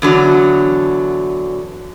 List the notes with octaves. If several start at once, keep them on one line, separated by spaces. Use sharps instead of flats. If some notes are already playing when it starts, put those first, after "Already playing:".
E2 D3 F#3